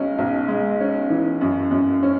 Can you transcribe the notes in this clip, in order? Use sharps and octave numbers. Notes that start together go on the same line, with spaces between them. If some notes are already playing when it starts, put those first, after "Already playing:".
Already playing: B1 G#3 C#4
B1
G#3
C#4
E3
F#2
F#2
C#4